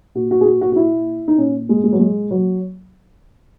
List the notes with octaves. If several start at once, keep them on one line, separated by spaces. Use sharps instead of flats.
A#2 F#4
F#4
G#4
F#4
F#4
F#4
E4
D#4
A#2 C#4
G#3
G#3
F#3
G#3
F#3